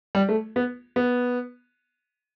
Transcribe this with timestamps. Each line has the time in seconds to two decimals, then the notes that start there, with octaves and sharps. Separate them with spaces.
0.15 G3
0.29 A3
0.56 B3
0.96 B3